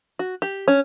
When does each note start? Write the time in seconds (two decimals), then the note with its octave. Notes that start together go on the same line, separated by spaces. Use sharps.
0.19 F#4
0.42 G4
0.68 C#4